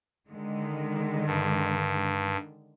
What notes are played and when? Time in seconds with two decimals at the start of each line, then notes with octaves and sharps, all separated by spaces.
0.27 D3 D#3 G#3
1.26 G2